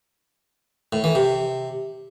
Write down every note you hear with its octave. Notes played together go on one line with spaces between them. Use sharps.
A2
E3
C3